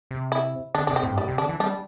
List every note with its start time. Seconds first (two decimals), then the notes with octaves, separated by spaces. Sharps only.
0.11 C3
0.32 E4
0.75 D3 D4
0.87 C3 D4
0.96 C4
1.03 A2
1.10 G2
1.17 A2 G3
1.28 C3
1.38 D3 D4
1.49 E3
1.60 G3 D4